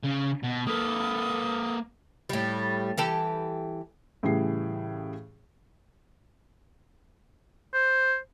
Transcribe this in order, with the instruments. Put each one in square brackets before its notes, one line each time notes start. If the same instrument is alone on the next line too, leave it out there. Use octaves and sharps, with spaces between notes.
[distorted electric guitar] C#3
B2
[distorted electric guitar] A#3 B4 [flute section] A4 D#6
[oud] A2 G3
E3 G4 A4
[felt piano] A2 C#3 E3 G3 G#4 C7
[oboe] C5